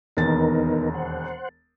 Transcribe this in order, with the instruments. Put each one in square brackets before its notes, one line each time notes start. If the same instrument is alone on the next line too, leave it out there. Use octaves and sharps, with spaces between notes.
[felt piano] E1 D#2 A6 [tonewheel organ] B3 D#4 A#4
[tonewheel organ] C5 F#5